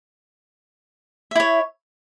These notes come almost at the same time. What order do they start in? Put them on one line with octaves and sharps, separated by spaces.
E5 E4 C#5